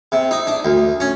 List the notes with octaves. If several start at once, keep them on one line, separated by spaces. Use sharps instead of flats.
C3
D#4
D4
D2
C#4